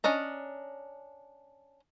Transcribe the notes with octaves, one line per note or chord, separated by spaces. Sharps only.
C#4 D4 D#5 A#5